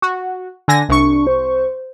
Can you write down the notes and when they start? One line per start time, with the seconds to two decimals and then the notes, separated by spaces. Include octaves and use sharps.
0.02 F#4
0.68 D3 G#5 A#6
0.89 C2 D4 C#6
1.27 C5